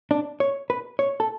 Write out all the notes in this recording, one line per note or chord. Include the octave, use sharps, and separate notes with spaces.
D4
C#5
B4
C#5
A4